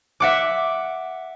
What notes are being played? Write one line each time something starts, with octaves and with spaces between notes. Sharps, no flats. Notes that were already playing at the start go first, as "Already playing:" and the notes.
E5 F#5 D6